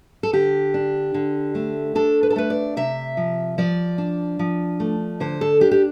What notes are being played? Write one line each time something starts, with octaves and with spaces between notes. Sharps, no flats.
A4
D3 G4
D4
D3
A3
D4 A4
B4
A4
A3 B4
D5
C3 E5
F3
F3 D5
D4
F3
A3
D3 C5
A4
D4 G4
G4